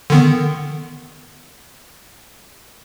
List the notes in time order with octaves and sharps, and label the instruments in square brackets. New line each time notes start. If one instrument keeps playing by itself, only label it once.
[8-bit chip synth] D3 D#3 B3